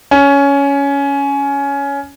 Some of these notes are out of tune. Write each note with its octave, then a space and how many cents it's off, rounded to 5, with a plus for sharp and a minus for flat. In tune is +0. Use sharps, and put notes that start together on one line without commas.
C#4 +15